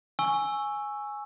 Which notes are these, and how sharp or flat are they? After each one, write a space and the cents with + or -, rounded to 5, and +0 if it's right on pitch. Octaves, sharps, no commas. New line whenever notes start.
G#5 +0 C#6 +0 E6 +0